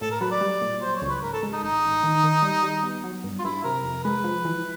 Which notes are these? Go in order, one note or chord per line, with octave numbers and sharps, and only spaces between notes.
A2 A4
A#4
F#3 B4
D5
G3
A#2
F#3 C5
C#5
C#2
B4
G#2 A#4
A4
G#3
D#4
A1 D#4
A1
D#3
D#3
G3
G3
B3
F#3
G2
F4
G2 E4
C3 A#4
F2
G#3 B4
F3
E3